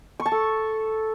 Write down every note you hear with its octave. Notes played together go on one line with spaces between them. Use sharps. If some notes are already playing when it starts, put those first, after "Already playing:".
C#6
A5
A4